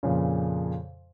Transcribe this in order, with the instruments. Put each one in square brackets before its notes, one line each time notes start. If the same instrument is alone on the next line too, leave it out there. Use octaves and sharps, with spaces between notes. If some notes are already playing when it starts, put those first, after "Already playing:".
[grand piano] F2 A#2 C#3